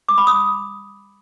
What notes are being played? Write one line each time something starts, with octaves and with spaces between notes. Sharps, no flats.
D6
B5
D#6